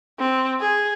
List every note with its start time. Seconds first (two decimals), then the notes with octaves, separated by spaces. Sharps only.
0.19 C4
0.60 G#4